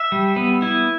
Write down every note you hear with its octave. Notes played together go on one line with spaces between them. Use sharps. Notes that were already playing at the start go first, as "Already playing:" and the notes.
Already playing: E5
G3
B3
E4